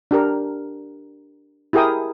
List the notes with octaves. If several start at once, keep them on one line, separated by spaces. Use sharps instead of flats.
D4 G4 A#4
E4 G4 G#4 A#4 G5 D#6